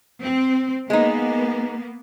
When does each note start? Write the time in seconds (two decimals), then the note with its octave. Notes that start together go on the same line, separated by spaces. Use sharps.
0.23 C4
0.90 G#3 A#3 B3 D#4